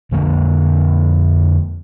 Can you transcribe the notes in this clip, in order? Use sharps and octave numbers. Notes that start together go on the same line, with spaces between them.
F2 D3 G#3 A#3